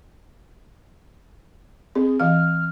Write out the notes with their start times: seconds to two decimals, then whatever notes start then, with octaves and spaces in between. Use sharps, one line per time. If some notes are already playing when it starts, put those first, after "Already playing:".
1.95 C4 G#4
2.20 E3 F5 F6